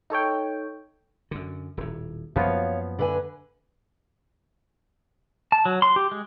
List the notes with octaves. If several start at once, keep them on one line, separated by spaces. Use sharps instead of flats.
D#4 A4 C#5 G5
F#2 D3
D#1 A2
F#2 F3 A#3 B3 C#5 F5
D3 B4 G#5
A5
F#3
C6
G4
G#3